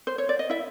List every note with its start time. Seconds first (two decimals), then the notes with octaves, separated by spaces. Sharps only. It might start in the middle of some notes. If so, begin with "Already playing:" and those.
0.07 C5
0.18 C#5
0.29 D5
0.39 D#5
0.50 E4 E5